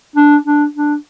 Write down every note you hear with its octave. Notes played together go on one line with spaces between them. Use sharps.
D4
D4
D4